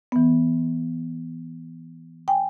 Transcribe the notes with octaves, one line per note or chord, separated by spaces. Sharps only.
E3 B3
G5 G#5